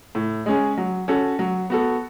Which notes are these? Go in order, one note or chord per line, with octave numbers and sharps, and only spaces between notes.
A2
G#3 C#4 G#4
F#3
C#4 F#4 A4
F#3
B3 F#4 A4